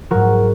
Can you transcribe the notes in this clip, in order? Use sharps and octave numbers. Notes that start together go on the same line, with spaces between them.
G#2 F#3 F#4 A#4